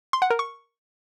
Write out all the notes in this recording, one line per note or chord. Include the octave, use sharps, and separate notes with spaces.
C6
F#5
A#4
C#6